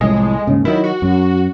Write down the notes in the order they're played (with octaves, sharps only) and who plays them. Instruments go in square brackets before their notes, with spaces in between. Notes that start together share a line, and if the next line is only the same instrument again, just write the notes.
[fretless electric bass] C2 F2 A2 [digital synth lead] G#3
[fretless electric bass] D#2 G#2 C#3
[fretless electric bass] D#3 F#3 [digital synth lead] E4
[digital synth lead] F#4
[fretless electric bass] F#2